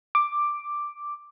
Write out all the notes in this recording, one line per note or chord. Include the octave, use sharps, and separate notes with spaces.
D6